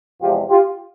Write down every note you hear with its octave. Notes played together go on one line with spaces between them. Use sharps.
E2 C3 F3 G#3 F4 G4
F4 G4